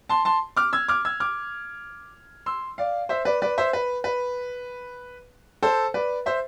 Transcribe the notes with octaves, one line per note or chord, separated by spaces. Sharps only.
A5 C6
A5 C6
D6 F6
E6 G#6
D6 F6
E6 G#6
D6 F6
C6 E6
D5 F5
C5 E5
B4 D5
B4 D5
C5 E5
B4
B4
A4 C5
B4 D5
C5 E5